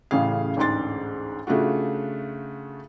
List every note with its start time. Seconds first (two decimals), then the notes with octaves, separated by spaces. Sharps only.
0.11 A1 A2 C#3 G#4 F5
0.57 A1 D2 G#2 D4 C6 A6
1.47 C#3 A3 D4 F4 F#4